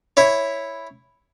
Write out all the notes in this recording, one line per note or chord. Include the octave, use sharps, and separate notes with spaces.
E4 C#5